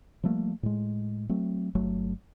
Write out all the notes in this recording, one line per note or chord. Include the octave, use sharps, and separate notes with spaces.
F3 G3 A3 A#3
A2 G#3
F#3 A3 C4
G1 F#3 A3